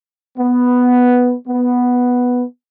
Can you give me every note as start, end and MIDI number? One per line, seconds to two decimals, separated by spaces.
0.38 1.34 59
1.47 2.44 59